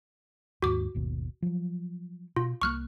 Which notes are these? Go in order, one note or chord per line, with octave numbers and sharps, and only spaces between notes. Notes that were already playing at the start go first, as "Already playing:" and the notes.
D#2 G#2 F#4 D6
G#1 D#2 B2
F3 F#3
B2 F4
C2 G3 A#3 C#6 F6 F#6